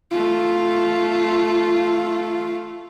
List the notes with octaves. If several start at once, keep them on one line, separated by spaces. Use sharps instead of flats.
A3 F4